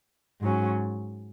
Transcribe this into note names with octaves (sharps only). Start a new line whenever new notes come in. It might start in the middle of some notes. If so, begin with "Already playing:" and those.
G#2 F#3 C#4